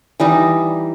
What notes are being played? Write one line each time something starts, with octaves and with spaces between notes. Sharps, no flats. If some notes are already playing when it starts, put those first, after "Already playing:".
E3 G3 D#4